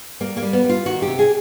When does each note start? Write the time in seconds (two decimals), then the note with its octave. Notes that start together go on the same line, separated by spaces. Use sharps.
0.21 G3 A#3
0.37 A#3
0.42 G3
0.53 B3
0.64 G3
0.69 F4
0.86 D#3 F#4
1.02 G4
1.08 C3
1.19 G#4